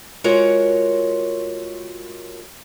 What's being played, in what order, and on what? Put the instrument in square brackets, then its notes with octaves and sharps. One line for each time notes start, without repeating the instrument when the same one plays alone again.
[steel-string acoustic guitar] G#3 F4 F#4 A#4 C#5